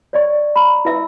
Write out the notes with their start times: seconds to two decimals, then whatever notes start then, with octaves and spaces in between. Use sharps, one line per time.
0.13 C#5 D5 C#6
0.56 A#5 B5
0.85 E4 B4 E5 E6